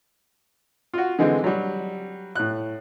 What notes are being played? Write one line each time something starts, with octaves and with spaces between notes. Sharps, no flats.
F4 F#4
D3 E3 G#3 C4
F#3 G3
A2 F#6